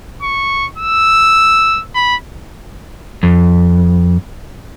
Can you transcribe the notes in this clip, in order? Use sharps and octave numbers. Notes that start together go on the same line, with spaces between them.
C#6
E6
B5
F2